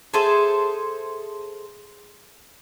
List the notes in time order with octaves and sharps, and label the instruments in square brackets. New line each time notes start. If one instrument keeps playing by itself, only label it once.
[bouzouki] G#4 A4 C5 E5